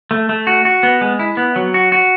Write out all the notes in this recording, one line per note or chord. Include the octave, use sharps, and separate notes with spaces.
A3
A3
F#4
F#4
B3
G#3
E4
B3
F#3
F#4
F#4